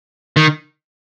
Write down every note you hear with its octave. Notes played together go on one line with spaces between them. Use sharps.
D#3